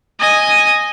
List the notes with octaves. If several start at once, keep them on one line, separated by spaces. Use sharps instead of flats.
D#5 G#5